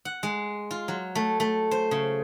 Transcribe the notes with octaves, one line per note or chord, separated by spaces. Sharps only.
F#5
G#3
F4
F#3
A3
A3
C5
C#3